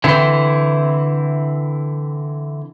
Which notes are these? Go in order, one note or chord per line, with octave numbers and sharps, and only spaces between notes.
D3 E3 C4 E4